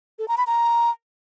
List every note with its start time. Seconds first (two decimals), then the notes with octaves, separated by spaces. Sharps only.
0.19 A4
0.28 A#5
0.38 B5
0.47 A#5